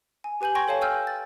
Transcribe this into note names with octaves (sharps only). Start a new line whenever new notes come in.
G#5
G4 B4 G#5 G6 F#7
G5 G#5 C6 C#6 G#6 A#6
A4 C#5 F5 A5
G5 G#5 E6 F6 G6
A6